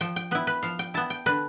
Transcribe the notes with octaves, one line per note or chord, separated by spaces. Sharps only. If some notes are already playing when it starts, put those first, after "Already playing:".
F3 G5
G5
B3 E4 B4
B4
F3 F5
G5
B3 E4 A5
G5
D3 B4